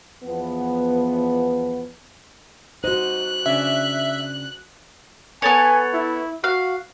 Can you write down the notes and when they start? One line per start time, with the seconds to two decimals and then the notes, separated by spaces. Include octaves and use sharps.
0.24 E2 F3 B3
2.84 D#4 F#4 C5 F#6
3.46 C#3 D4 E5
5.42 B3 A4 C#5 G#5
5.94 E4
6.44 F#4 F5